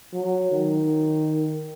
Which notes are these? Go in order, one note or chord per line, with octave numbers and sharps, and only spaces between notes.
F#3
D#3